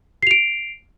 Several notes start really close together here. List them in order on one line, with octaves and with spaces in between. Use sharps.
C7 F7 D7